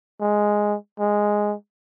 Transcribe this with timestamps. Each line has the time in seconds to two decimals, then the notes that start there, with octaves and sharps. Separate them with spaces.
0.21 G#3
0.99 G#3